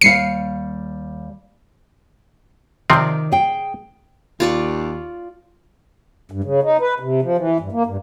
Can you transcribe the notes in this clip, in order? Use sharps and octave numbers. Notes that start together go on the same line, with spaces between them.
D#2 G3 F5 C7 C#7
C3 D#3 F3 C4 D5
G#4 G5
D#2 F4 D5 C#6
G2
C#3
D#4
B4
C3
F3
E3
G2
A#3
G2